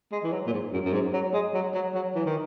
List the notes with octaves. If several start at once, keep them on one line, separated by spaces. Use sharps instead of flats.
G#3
E3
F#3
A#2
G#2
F#2
F#2
G#2
F#3
G#3
F#3
F#3
F#3
E3
D#3